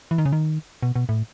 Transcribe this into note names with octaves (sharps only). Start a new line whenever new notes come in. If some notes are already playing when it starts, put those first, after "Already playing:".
E3
D#3
C#3
D#3
B2
B2
A2